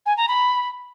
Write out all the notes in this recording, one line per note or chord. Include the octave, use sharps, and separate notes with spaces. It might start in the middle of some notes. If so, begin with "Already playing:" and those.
G#5
A#5
B5